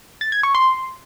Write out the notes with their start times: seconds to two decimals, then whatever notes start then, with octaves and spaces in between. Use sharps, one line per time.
0.21 A6
0.32 G#6
0.43 C#6
0.55 C6